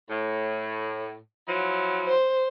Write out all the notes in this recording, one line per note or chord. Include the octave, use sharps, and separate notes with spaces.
A2
F3 F#3 E4
C5